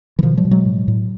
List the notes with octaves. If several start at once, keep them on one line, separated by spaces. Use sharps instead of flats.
E3
B2 D#3 F3
F3 G3
B2
F#3 G#3
A2
A2